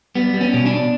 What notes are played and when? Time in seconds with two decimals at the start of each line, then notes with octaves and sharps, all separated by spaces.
0.15 G3 B3
0.34 G3
0.41 C#4
0.54 B2
0.66 D4